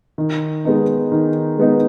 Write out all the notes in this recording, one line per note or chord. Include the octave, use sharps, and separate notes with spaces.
D#3
G#3 B3 D#4
D#3
G#3 B3 D#4